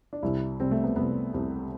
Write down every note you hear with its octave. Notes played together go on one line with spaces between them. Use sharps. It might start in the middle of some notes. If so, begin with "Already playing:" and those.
D4
C2 C3 G3 E4
C2 C3 G3 C4
A3
B3
C2 C3 G3 B3
C2 C3 G3